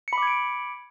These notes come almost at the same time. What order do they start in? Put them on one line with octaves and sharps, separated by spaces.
C#7 B5 D6 G#6 D7